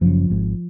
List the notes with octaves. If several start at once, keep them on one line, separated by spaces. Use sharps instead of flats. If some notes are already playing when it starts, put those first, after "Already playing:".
F#1 F#2 C#3 F3
G#1 G#2